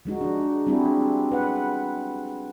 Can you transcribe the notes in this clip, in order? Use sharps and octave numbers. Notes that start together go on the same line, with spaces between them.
F3 G#3 D#4 F#4
D4
G3 C4 D4 E4 F#4 G#4
B4 F#5